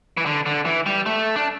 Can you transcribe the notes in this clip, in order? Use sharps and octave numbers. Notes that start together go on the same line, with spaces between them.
E3
D3
D3
E3
G3
A3
D4